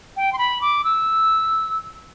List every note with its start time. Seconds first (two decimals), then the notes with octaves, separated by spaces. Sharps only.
0.17 G5
0.33 C6
0.38 B5
0.61 D6
0.84 E6